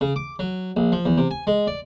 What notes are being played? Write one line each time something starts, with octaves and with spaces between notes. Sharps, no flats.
C#3
D6
F#3
A#1
F3
E2
C3
G#5
G#3
D5